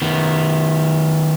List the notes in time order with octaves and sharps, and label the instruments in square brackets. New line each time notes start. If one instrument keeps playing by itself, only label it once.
[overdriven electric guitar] D#3 B3